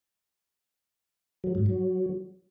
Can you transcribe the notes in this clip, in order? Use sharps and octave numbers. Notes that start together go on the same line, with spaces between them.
F#3
G#2
F#3